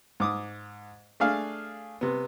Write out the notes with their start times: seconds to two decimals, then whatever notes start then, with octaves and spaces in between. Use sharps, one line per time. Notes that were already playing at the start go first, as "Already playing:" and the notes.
0.20 G#2 D6 D#6
1.20 A3 D4 G#4 F5
2.01 C3 B3